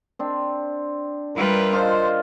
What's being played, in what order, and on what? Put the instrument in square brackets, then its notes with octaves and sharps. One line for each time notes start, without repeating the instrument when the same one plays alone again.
[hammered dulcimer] C4 D4
[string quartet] G3 F4 B4 [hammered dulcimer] A#4 E5
[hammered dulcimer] D4 F4 D#5 [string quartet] C5